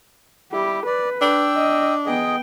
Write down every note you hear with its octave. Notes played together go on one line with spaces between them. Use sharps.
G3 E4 G4
B4 D5
D4 G5 E6
D#5
B3 G#4 D#5 G5